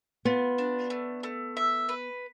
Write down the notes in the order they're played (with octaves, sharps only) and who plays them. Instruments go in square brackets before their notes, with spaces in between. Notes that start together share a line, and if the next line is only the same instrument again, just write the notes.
[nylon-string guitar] B3 [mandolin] F4
[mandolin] D4
A3
A3
E5
B4